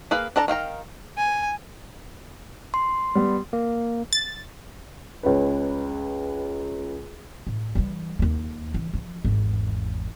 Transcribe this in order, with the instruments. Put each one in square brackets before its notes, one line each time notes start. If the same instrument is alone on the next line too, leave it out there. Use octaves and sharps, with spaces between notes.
[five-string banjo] A#3 G#4 B4 F5
D4 A4 A5 A#5
D#3 F5 G5 A#5
[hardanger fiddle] G#5
[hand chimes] C6
[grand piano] G3 B3
[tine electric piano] A#3
[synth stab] A6
[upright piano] C#2 C#4 B4
[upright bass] A2
E3 G3
D#2 A#3
E3
F3
G#1 E2